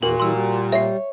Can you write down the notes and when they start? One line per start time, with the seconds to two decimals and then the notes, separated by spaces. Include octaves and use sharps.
0.03 E2 A#2 F#4 A#4 F#7
0.20 E3 G3 C6 E6
0.33 G3
0.72 C#5 E5 C7